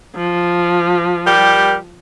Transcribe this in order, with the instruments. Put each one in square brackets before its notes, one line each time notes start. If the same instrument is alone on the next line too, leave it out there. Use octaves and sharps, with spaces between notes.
[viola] F3
[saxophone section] G3 G4 A#4